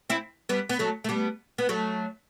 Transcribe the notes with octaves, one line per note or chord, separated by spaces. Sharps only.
C4 E4
G3 B3
B3
F#3 A3
A3
G3 B3
B3
F#3 A3